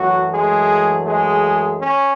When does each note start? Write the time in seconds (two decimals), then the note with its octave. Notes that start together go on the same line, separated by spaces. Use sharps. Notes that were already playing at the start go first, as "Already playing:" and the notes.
Already playing: F#2 E3 F#3 A3 F#4
0.32 G#3 G#4
1.07 G#3 G#4
1.79 C#4